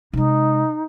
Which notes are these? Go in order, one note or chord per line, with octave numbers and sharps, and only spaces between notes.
C3 G#3 D#4